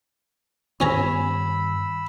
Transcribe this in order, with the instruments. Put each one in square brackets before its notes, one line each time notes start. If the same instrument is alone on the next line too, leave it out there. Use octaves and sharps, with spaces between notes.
[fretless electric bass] G2 D#3 B3 [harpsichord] C#4 C#5 A#5 [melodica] B5 E6